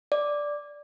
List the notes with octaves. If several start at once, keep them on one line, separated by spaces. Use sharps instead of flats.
D5